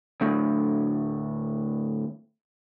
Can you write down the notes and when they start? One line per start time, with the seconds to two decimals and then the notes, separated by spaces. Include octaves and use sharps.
0.21 D2 A2